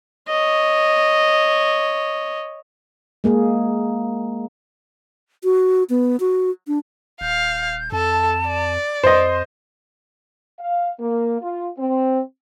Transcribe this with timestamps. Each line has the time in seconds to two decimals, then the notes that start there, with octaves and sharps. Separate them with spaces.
0.29 C#5 D#5
3.24 G#3 A#3 G#4
5.44 F#4
5.90 B3
6.20 F#4
6.67 D4
7.21 D#1 F5 G6
7.92 F2 A4 A5
8.47 D5
9.04 F2 C5 D#5 C6
10.60 F5
11.00 A#3
11.41 F4
11.79 C4